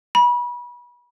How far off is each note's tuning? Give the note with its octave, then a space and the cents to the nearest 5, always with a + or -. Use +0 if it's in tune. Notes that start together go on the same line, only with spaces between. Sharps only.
B5 -30